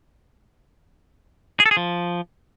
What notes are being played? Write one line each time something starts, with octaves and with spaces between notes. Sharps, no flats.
G#4
A4
G#4
F3